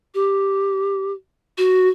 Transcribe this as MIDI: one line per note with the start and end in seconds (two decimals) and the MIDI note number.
0.14 1.12 67
1.58 1.89 66